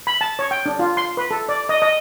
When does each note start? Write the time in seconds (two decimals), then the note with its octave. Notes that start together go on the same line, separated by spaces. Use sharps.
0.07 B5
0.21 A5
0.39 C#5
0.51 G5
0.66 D4
0.79 F4
0.97 C6
1.17 B4
1.31 A4
1.49 D5
1.69 D#5
1.82 D#5